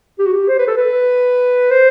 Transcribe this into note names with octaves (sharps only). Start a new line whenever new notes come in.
G4
F#4
G4
C5
B4
A4
B4
C5